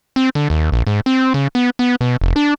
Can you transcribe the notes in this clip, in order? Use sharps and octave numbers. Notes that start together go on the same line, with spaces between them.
C4
D3
D#2
A#1
G#2
C4
C#3
B3
B3
B2
F1
D4